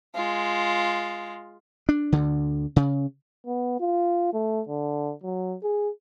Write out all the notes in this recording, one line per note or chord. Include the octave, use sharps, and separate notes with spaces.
G#3 F4
D4
D2 D3
C#3
B3
F4
A3
D3
F#3
G#4